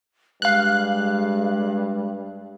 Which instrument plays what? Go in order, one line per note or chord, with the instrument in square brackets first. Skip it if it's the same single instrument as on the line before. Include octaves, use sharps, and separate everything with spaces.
[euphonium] G2 [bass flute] G#3 [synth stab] F5 F#6